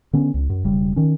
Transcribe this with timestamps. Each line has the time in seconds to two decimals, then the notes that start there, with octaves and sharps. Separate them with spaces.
0.13 D3 B3 C#4
0.34 C#2
0.50 F#2
0.64 E1 C#3 G3
0.96 D#3 C#4